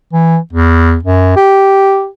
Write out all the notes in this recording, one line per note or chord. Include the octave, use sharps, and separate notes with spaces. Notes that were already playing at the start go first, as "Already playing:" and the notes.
E3
E2
F#2
G4